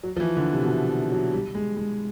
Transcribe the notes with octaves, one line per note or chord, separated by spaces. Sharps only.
F#3
F3
E3
D3
C3
B2
C3
F#3
G3
G#3
G#3